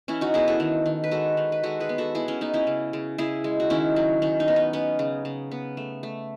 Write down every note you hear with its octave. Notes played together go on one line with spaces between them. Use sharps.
E3 C#4 E4
D#4 F#4
B3 E4 G#4
F#4 A4
D#3
D#3
B4
G#3 F#4 A4
D#3
B4
G#3 F#4 A4
G#4 B4
B3
F#4 A4
B3 E4 G#4
C#4 E4
B3 D#4
C#4 E4
C#3
C#3
C#3 E4 G#4
G#3
F#4
D#3 C#4 E4
F#3
D#3 C#4
D#4
B3
D#4
B3 C#4
C#3
C#3
B3
A3
A3